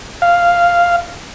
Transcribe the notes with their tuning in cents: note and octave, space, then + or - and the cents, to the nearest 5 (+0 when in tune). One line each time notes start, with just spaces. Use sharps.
F5 -5